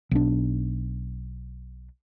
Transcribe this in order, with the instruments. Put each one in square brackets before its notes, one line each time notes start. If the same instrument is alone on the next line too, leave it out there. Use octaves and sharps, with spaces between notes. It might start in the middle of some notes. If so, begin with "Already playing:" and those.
[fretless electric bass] B1 D4